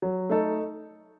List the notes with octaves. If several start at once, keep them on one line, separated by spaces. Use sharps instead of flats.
F#3
A3 D#4 A4